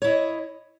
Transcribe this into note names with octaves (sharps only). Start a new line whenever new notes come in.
E4 C#5 D#5